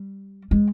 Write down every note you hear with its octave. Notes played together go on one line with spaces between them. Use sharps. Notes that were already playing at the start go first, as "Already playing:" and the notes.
Already playing: G3
G#3